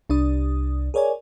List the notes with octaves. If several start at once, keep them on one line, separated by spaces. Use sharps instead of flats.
C2 D4 D5 D#6
G#4 A#4 C#5 D5 G#5